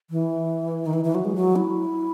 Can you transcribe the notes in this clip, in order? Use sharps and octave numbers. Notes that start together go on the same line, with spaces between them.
E3
D#3
E3
E3
F#3
G#3
F#3
E4